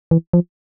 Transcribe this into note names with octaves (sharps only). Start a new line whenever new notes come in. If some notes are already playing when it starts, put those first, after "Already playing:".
E3
F3